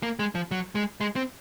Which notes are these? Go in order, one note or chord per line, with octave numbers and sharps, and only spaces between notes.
A#3
G#3
F3
F#3
G#3
G#3
C4